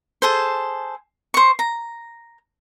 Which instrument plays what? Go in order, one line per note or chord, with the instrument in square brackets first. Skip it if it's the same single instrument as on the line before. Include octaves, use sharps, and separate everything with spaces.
[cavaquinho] G#4 A4 C5
C5 C#6
A#5